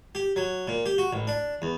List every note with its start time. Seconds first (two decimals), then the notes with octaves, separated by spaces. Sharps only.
0.15 G4
0.36 F#3
0.68 A#2
0.86 G4
0.98 F#4
1.13 A1
1.27 D4
1.62 E2